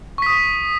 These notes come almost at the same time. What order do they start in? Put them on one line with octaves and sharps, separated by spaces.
C#6 B6 D#6